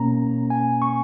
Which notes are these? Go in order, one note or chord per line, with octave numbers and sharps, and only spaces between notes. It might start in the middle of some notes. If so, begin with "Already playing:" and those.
Already playing: B2 A#3 C#4 A#5
G#5
C#6